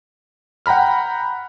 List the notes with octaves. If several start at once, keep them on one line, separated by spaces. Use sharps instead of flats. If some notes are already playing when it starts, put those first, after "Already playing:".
F#5 G5 A#5 B5 F6